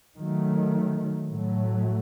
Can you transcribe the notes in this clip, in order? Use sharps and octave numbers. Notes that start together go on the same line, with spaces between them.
D#3 F#3 A3
A2 F#3 A3